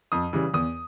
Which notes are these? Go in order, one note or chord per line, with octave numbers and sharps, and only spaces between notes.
F2 D#6
C#3 E3 G3
E2 D#6